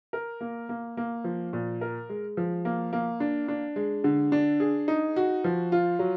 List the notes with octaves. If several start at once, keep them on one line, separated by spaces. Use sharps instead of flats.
A#4
A#3
A#3
A#3
F3
A#2
A#4
G#3
F3
A#3
A#3
D4
D4
G#3
D3
D4
G#4
D#4
F#4
F3
F4
F#3